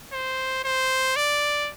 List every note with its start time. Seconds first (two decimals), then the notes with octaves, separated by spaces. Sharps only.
0.13 C5
0.64 C5
1.16 D5